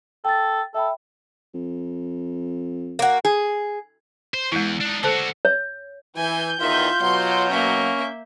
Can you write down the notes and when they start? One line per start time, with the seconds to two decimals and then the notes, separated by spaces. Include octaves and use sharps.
0.25 A4 G5 A6
0.75 A4 E5 G5 B5
1.54 F2
2.99 A#3 F#4
3.25 G#4
4.34 C5
4.52 E2 G#3 E4
4.81 D4 D#4
5.03 D3 F#4 A4 C5 A5
5.45 C#5
6.17 E3 G#5 G6
6.60 E2 D#3 F4 E5
7.02 B2 F#3 C6
7.50 A#3 C#4 E5